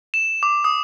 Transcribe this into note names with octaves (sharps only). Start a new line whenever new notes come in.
E7
D6
D#6